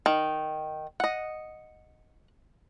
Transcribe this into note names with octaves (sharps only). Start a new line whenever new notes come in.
D#3
D#5 F#5